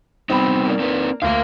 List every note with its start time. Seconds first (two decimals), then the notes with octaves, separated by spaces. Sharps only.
0.30 G3 B3 C4 D#4 B5
0.65 A#3 D4
0.79 C4 D#4 B4
1.22 D2 A#3 A#4 F5